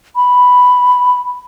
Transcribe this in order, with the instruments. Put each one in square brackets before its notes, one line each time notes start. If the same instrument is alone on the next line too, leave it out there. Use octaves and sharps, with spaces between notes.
[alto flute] B5